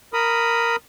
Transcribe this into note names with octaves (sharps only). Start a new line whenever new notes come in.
A#4 B5 D#6